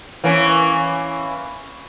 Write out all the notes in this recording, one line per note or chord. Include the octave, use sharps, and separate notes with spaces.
E3 A#3 C#4